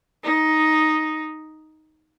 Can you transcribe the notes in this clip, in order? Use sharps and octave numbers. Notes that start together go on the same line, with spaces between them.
D#4